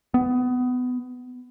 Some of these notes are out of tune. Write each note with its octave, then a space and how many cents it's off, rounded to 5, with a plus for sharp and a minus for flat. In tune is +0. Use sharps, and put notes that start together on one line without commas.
B3 +20